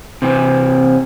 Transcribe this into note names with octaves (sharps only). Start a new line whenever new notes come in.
C3 E3 C4